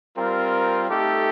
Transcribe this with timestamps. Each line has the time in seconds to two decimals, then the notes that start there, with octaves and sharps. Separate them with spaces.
0.17 G3 C4 F4 A#4
0.90 A3 D#4 G4 A4